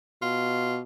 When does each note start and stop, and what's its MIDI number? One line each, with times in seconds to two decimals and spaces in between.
0.22 0.81 47
0.22 0.77 65